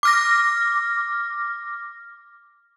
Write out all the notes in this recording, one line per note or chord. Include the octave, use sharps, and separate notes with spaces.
D6 F6 A#6